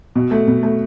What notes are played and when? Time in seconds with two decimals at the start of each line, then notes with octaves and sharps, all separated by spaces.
0.16 B2
0.31 A3
0.48 B2
0.63 A3